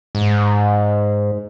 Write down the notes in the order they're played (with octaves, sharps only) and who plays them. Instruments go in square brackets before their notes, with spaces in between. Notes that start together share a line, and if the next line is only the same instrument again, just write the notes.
[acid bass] G#2